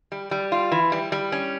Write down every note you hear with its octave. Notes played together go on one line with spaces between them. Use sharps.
G3
G3
F4
E3
G3
G3
C#4